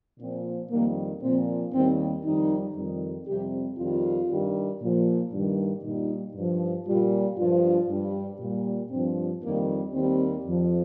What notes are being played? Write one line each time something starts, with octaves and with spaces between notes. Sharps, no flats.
A#2 F3 C4
F2 D#3 G3 A#3
A#2 F3 C4
D#2 D#3 G3 C4
F2 D#3 G3 D#4
F2 D#3 G3
F2 C3 G3 G4
F2 D#3 G3 F4
G2 D#3 G3
A#2 F3
G2 D#3 G3
A#2 G3 D#4
G2 F3
A#2 G3 F4
G2 F3 F4
G2 G3
A#2 G3
G2 F3 C4
F2 D#3 G3 A#3
D#2 D#3 G3 C4
F2 F3